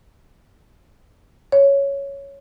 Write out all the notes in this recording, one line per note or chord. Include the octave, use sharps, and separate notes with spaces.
C#5